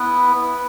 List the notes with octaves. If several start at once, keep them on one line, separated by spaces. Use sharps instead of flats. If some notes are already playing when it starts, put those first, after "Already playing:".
Already playing: B3 E4 B4
B3 E4